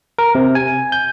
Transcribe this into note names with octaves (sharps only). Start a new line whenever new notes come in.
A#4
C3
G#5
G6